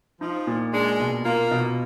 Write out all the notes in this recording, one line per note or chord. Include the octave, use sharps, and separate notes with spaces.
F3 D#4
A#2
G#3 D4
B2
A#3 F4
B2